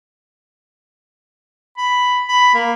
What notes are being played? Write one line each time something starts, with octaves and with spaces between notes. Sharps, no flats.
B5
B5
A#3